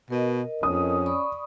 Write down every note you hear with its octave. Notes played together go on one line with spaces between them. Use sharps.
B2 A#4 D#5
F2 C#4 D#6
D5 B5 C#6